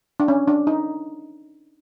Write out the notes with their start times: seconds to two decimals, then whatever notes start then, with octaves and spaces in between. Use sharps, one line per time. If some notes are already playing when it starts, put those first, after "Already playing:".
0.20 D4
0.28 C#4
0.48 D4
0.67 D#4